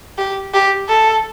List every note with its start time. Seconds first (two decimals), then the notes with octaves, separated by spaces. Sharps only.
0.18 G4
0.54 G4
0.89 A4